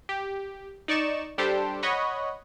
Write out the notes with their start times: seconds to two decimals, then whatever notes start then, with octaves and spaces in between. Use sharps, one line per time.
0.09 G4
0.88 D#4 D5 C#6 E7
1.38 G3 D4 G4 A4 C5
1.83 C#5 D#5 F#5 B5 C#6